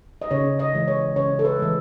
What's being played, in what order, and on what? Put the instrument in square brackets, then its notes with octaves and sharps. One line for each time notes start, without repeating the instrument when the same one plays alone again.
[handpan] D#5
C#3 C#5
D#5
E3 G#3
C#5
C#3 C#5
A4
B4
E3 G#3